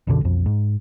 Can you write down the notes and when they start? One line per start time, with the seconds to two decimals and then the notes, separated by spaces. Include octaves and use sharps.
0.07 B1 F#2 B2 D3
0.21 B1 F2
0.46 G#2